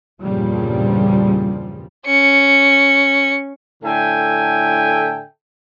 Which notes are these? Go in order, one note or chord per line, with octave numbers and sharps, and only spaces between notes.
E2 G2 A#2 C#3 F3 G3
C#4 C#7
A2 D3 A4 E5 G5 G#5